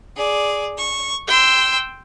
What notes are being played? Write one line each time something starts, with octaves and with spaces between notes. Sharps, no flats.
G#4 D5
C#6
G5 C6 E6